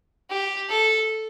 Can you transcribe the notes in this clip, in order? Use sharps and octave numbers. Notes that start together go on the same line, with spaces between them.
G4
A4